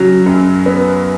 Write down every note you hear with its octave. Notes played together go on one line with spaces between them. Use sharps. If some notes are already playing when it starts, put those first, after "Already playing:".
Already playing: C#3 F#3
F#2
B3